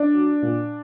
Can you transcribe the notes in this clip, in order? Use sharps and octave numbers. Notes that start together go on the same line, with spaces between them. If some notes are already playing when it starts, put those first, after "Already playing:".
Already playing: D4 D5
F#3
A#2